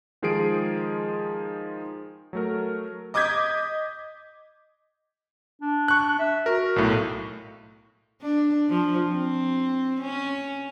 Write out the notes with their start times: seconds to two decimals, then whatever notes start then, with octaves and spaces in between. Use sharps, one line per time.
0.22 D#3 F3 G#3 G#4 C7 D7
2.33 F#3 A3 A#4
3.14 D#5 D6 D#6 G6 G#6 B6
5.62 D4
5.88 C#6 F#6
6.19 E5
6.46 F#4 A#4
6.76 B1 A2
8.22 D4
8.69 F3
9.11 C4
10.01 C#4